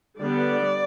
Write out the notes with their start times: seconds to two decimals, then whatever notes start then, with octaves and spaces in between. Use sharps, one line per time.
0.19 D3 G3 B3 D5